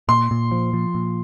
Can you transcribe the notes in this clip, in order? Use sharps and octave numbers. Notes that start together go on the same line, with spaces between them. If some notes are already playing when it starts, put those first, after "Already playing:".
A#2 C6
A#2
F3
F3
A#2